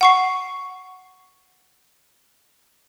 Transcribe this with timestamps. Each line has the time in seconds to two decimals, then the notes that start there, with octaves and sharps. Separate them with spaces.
0.01 F#5 C#6 C7